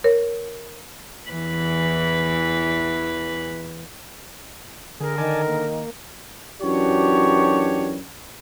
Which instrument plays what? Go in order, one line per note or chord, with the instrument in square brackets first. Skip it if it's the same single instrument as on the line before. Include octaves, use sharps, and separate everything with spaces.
[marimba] A#4 C#5
[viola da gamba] E2 E3 B4
[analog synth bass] D3 [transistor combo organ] G#4 [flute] A#4
[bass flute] D#3 [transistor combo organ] D5 G#5 A5
[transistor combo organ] A#3
[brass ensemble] F#2 E3 D4 F#4 G4 C#5